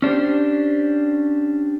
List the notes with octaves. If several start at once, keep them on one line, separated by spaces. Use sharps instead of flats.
C#4 D4 G4 C5